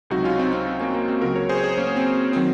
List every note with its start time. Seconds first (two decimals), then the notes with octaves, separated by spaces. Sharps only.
0.10 C#2 C3 F#3 D#4 F#4
0.24 C#4 F4
0.38 C4 D#4
0.53 C4
0.66 C4
0.80 A#3 C#4
0.95 A#3
1.08 C4
1.22 C#2 C#3 F#3 F#4 A#4
1.35 A#4 C#5
1.49 G#4 C5
1.58 C#5
1.63 G#4 C5
1.78 A#3 C#4
1.96 C4
2.33 D#3 F#3 C4